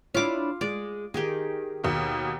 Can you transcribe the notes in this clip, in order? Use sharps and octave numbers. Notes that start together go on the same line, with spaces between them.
D4 E4 F4 C#5 D6
G#3 D5
D#3 D#4 G4 G#4
D#2 B2